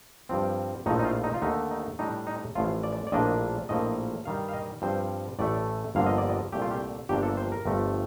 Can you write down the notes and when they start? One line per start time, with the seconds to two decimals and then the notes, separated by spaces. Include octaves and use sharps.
0.29 G2 F3 C4
0.86 A#1 A2 F3 A3 D#4
0.99 D#4
1.05 F4
1.24 D#4
1.34 F4
1.42 D#2 D3 A3 D4 D#4
1.71 D#4
1.99 A2 G3 D4 D#4
2.27 D#4
2.55 A1 A2 F3 F4
2.83 D5
3.07 D5
3.12 A#1 A2 F3 A#3 D4 D#5
3.69 A#1 A2 F3 A#3 D#5
4.25 G2 D#3 G3 F5
4.48 F5
4.54 D#5
4.82 G2 F3 C4 C5
5.39 A1 A2 A3 D5
5.95 G1 G2 D3 F3 A#3 F5
6.06 D#5
6.18 D5
6.29 D#5
6.52 C2 A#2 A3 G4
6.62 F4
6.71 G4
7.09 G1 G2 F3 A#3 D4 G4
7.23 A4
7.37 C5
7.52 A#4
7.65 G1 G2 F3 A3